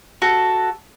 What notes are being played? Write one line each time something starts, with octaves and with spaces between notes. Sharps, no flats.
F#4 A4